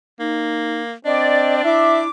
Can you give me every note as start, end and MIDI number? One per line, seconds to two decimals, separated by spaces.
0.20 0.93 58
0.20 0.82 63
1.05 1.61 60
1.05 2.10 62
1.05 1.63 74
1.05 1.58 75
1.64 2.08 64
1.64 2.02 76
1.64 2.10 86